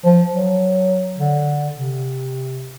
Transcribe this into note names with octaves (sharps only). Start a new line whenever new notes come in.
F3
F#3
D3
C3